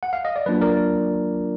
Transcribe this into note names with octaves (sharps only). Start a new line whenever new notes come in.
F#5
F5
D#5
D5
F#3 A#3 D4 F4 B4
A#4 D5